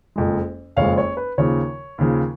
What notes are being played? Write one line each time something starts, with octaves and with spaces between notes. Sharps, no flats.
F#1 F2 F3 G#3
F#1 F2 F3 G#3 C#5 F5
C#5
B4
D#2 C#3 F3 C#5
D#2 C#3 F3